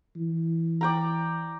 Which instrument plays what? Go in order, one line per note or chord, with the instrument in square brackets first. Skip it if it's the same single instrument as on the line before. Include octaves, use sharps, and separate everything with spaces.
[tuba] E3
[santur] D5 G5 A#5